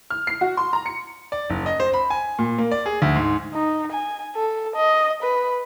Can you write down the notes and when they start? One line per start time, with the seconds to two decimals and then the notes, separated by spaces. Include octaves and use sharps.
0.10 F6
0.27 C7
0.41 F#4
0.57 C6
0.73 A#5
0.86 C#7
1.32 D5
1.50 F#1
1.66 D#5
1.80 C5
1.94 B5
2.10 G#5
2.39 A#2
2.58 A#3
2.71 D5
2.86 G#4
3.02 D2
3.15 G#2
3.54 D#4
3.93 G#5
4.36 A4
4.76 D#5
5.23 B4